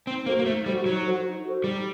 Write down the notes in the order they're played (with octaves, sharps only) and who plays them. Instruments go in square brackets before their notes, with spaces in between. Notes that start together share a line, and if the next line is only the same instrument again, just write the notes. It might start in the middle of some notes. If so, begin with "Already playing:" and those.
[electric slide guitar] C4 [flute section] D#4
[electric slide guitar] A#3 [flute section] F#4 A4 C5
[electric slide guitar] A#3
[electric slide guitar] A3 [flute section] D#4
[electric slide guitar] G3 [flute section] F#4 A4 C5
[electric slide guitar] F#3 [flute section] D#4
[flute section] F#4 A4 C5
D#4
F#4 A4 C5
[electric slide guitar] G3 [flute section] D#4